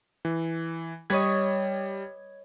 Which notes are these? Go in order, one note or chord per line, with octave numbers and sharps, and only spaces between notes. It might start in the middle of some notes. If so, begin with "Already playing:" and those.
E3
G3 B4 C#5 D#5 G#6